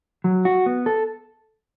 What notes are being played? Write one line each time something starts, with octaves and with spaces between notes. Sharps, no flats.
F#3
F#4
B3
A4